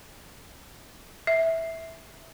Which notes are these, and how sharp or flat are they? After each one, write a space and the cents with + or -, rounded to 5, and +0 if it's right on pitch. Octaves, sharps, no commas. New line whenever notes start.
E5 -10